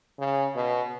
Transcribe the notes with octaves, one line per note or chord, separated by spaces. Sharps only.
C#3
B2